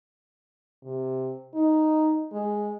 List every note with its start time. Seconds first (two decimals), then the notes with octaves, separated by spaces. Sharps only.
0.84 C3
1.54 D#4
2.32 G#3